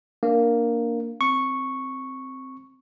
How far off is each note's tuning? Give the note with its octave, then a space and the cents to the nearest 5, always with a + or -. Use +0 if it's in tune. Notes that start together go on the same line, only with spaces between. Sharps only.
A#3 +0 D4 +0
C4 +0 C#6 -5